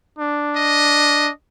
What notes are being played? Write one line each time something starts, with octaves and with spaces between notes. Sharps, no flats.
D4
D#5